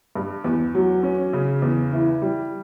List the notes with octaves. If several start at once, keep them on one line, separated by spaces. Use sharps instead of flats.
G2
E2
F#3
C#4
C#3
E2
E3
G3